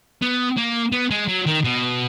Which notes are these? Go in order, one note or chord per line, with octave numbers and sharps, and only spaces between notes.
B3
A#3
B3
G#3
F#3
D#3
B2